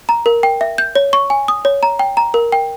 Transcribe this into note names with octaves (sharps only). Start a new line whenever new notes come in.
A#5
A#4
G5
E5
G6
C#5
C#6
G#5
D#6
C#5
A#5
G5
A#5
A#4
G5